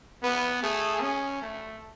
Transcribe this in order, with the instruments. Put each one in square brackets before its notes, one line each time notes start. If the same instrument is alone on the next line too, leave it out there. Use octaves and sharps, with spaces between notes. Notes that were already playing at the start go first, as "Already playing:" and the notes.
[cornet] B3 [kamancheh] B4
[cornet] A3 [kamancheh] G#4
[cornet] C#4
A3